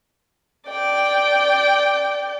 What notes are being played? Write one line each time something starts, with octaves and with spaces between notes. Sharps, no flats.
D5 G5